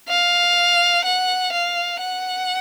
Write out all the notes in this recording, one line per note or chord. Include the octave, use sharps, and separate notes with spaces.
F5
F#5
F5
F#5